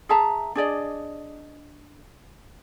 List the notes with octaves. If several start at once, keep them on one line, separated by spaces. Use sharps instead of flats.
G#4 E5 A5 A#5
D4 G#4 D5 D#5